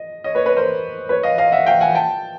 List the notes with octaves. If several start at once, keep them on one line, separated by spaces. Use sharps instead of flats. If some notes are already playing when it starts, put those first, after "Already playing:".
Already playing: D#5
C#5 D#5
B4 C#5
B4 C#5
A#4 C5
B4 C#5
D#5 F5
D#5 F5
E5 F#5
F5 G5
F#5 G#5
G5 A5